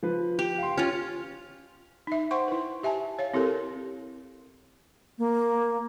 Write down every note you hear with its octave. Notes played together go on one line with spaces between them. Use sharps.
F3 B4
G4
F5 C6
C#4 F4 F6
D#4 E5
C5 F#5 G5 C6 C#6
E4 B4
G4 E5 G#5 A5
C#5 F5
C4 E4 G4 A4 A#4
A#3